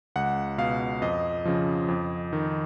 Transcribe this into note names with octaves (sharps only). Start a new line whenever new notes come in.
C#2 F#5
B2 F5
F2 D#5
C#3 F3
F2
D#3